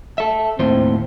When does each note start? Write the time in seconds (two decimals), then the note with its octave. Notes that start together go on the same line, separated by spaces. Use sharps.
0.18 A4 E5
0.59 D#2 A2 C4 C5